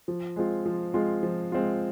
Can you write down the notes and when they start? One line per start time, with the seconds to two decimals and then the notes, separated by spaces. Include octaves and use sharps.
0.08 F3
0.36 G#3 C4 F4
0.65 F3
0.94 G#3 C4 F4
1.23 F3
1.52 G#3 C4 F4